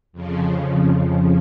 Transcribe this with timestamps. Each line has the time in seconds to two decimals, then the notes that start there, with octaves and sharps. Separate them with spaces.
0.13 F2 C#3 F3